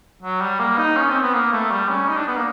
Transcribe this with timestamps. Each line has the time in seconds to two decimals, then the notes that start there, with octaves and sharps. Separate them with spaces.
0.22 F#3
0.41 G3
0.59 A#3
0.78 D#4
0.97 C#4
1.10 C4
1.22 B3
1.34 A#3
1.53 A3
1.71 G3
1.89 C#4
2.09 D#4
2.17 D4
2.27 B3
2.37 A#3